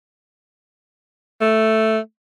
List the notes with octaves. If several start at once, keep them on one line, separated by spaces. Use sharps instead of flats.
A3